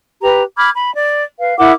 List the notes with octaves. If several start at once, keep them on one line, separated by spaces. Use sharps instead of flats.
G4 B4 A#5
B5 D6 F6 G#6
B5
D5
B4 F5
E4 A#4 F#5 D6